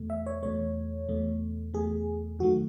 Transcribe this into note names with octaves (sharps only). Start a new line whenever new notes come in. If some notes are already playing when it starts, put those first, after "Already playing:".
Already playing: E2 B2 A3
E5
C#5
E2 B2 A3 C#5
E2 B2 A3
E2 B2 A3 G#4
F#2 D#3 A3 F#4